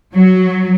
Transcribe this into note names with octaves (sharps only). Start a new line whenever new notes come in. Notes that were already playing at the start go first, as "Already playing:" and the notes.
F#3